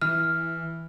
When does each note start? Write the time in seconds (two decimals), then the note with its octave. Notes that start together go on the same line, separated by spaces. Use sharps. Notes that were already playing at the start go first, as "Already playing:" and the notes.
0.01 E3 F6